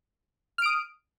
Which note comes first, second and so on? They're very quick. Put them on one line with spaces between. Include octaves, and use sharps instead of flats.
F6 D7 D#6